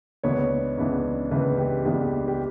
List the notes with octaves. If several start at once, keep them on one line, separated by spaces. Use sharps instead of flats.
C#2 C#3 E3 B3 D4 C#5
C#2 C#3 E3 B3 D4
C#2 C#3 E3 B3 D4 B4
G4
C#2 C#3 E3 B3 D4 G4
G4